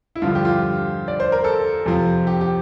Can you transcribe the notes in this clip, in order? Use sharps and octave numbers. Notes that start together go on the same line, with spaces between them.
E4
G2 D3 F3 F4
G4
F4
G4
D5
C5
A#4
A4
F2 C3 F3
G4
G4